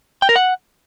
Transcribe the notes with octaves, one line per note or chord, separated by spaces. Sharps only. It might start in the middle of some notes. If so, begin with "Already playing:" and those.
G5
A#4
F#5